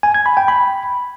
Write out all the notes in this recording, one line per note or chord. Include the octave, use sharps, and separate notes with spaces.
G#5
G#6
B5
G5
B5